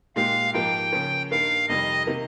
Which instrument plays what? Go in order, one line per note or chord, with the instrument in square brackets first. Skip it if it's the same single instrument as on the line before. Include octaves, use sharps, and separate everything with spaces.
[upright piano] A#2 G#3 D#4 G4 [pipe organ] F5
[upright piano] G#2 F3 A#3 D#4 G4 [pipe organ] G5
[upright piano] C#3 F3 A#3 C#4
[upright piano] G2 D#3 A#3 D#4 [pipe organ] F5
[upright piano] F2 C3 D#3 G3 [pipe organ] D#5
[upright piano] C3 D#3 A#3 D#4